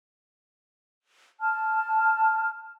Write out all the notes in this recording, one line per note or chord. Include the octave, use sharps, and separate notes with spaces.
A5 F6